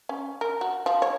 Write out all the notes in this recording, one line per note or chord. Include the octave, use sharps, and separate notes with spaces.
C#4
A#4
F#4
F3
C#5